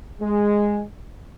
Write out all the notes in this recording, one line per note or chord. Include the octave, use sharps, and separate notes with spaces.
G#3